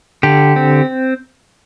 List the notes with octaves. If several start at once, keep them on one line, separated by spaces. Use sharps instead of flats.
D3 G4
C4